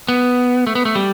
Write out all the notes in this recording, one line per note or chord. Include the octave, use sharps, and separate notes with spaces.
B3
A3
B3
A3
G3